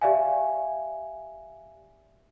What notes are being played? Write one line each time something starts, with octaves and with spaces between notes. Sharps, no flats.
G4 D5 E5 F5 G#5